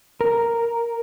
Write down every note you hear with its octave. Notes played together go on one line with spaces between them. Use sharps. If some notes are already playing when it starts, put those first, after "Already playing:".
A#4